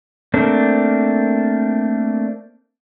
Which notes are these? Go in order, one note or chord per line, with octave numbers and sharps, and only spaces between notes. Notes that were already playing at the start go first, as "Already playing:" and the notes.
A3 A#3 C4 D4